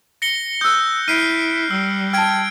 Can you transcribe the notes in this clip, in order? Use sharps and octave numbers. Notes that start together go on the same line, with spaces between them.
A#6 C#7 G7
D#6 E6 F#6 G6
E4 F6 C7 D7 D#7
G3 E6
G5 A5 F6 G#6 D7